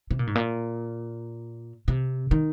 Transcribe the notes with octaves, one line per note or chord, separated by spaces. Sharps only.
C3
A#2
G#2
A#2
C3
D#3